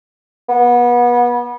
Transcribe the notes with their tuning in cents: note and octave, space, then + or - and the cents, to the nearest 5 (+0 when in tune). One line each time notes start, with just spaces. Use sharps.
B3 -30